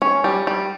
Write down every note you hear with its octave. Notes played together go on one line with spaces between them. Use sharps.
C#4
G3
G3